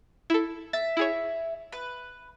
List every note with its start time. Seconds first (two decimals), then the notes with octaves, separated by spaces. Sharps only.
0.30 E4 A4
0.73 E5 A6
0.97 E4 G#4 C#5
1.72 B4